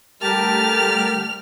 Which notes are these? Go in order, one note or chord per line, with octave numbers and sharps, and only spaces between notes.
D3 G3 A3 G4 A#4 A5 F6